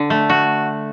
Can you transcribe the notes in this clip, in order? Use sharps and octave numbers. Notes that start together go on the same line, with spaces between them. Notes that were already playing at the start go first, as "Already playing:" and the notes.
Already playing: D3
A3
F#4